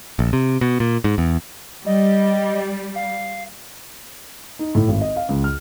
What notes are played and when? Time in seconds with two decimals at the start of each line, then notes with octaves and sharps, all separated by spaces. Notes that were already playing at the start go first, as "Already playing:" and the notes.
0.19 A#1
0.33 C3
0.61 B2
0.80 A#2
1.04 G#2
1.18 E2
1.86 G3 D#5
2.95 F5
4.59 D#4
4.75 A2
4.88 G#1
5.01 D#5
5.16 F5
5.29 C#2
5.44 F6